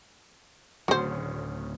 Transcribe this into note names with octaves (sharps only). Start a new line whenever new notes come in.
D1 D2 C#3 F#4 C5